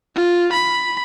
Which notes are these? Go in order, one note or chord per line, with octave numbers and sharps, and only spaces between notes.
F4
B5